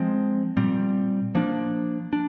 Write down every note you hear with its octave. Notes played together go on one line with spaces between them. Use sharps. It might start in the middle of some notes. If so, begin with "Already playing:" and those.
Already playing: F3 G#3 C4
A#2 G3 C4
F3 A#3 D4
D4